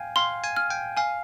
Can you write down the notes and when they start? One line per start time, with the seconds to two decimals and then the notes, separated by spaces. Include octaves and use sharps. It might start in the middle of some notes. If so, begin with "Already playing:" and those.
Already playing: F5 G5 G#5
0.16 F5 C6
0.44 G#5
0.57 F6
0.71 G5
0.97 F5 G#5